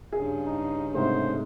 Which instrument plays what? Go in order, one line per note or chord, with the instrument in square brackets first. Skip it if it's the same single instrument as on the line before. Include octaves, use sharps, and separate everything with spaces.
[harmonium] G2 C#3 [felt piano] G#4
[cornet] D#4
[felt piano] G#2 C3 A3 [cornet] C5